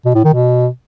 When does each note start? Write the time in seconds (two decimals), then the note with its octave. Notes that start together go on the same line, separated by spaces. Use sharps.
0.05 B2
0.15 A2
0.24 D#3
0.34 B2